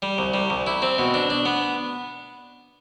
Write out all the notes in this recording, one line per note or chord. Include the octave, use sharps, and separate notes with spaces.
G3
C2
G3
C2
E4
C4
B2
D4
D4
B3